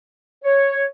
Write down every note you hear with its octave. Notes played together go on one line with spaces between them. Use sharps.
C#5